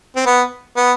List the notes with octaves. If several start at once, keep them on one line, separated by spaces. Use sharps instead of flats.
C4
B3
B3